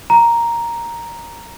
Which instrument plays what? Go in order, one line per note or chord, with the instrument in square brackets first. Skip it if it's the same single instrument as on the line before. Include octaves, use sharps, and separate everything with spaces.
[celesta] A#5